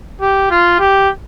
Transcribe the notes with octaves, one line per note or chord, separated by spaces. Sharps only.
G4
F4
G4